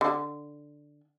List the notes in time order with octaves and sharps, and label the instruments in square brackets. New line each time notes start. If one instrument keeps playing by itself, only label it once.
[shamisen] D3